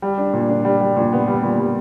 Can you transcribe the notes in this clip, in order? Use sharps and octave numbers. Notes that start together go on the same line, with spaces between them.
G3
D4
A#2
D4
G3
G3
A#2
B3
G3
A#2
G3